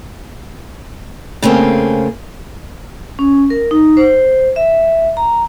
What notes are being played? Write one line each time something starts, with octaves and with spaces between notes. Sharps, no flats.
C#3 A3 A#3 C4 G#4
C#4
A#4
D#4
C5
E5
A#5